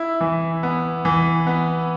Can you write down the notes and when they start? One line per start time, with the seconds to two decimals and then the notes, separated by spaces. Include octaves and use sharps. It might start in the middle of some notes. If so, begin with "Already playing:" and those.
Already playing: E4
0.21 E3
0.63 B3
1.05 E3
1.47 B3